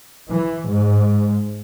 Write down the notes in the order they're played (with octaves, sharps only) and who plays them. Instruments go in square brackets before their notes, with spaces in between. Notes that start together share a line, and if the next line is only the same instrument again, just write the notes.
[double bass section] E3
G#2